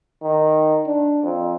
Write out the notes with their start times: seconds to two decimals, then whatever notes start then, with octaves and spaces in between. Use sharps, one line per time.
0.23 D#3
0.87 D4
1.23 F2